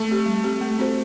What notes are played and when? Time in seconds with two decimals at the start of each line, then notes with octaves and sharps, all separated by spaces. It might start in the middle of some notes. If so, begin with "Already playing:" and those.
Already playing: A3
0.08 C4 G4
0.26 G3
0.44 C4 G4
0.61 A3
0.79 C4 F#4 A4 C5